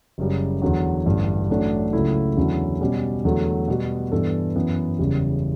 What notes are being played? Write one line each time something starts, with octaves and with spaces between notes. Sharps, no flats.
F#1 F#2 C#3 G3
E2 D3 F#3
A1 G2 D3
A1 A2 F#3 A3 D4
C#2 C#3 F#3 A3 E4
E2 D3 F#3 C#4 E4
B2 G3 C#4
E2 D3 F#3 A3
B2 G3 B3 F#4
G2 E3 B3 D4 A4
F#2 E3 B3
F#1 E2 C#3 G3